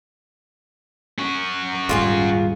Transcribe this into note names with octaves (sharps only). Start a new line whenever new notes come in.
C#4 F#4
D#1 G#2 G3 F4 G4 G#4